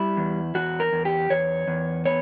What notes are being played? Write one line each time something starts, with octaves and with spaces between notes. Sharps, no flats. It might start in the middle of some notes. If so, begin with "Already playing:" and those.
Already playing: G3 E4
E2
E2 F#4
A#4
E2
G4
E2 C#5
E2
B3 C#5